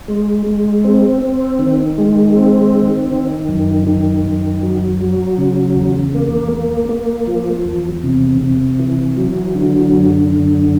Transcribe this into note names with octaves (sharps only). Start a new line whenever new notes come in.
G#3
G#3
C4
C4
D#3
G#3
C4
D#3
D#3
F#2
D#3
F#2
F#3
F#3
C#3
E2
A#3
A#3
A#3
F3
E2
C3
C3
E3
F#3
D3
F#2
D3